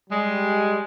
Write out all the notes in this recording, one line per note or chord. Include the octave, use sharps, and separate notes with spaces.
G3 G#3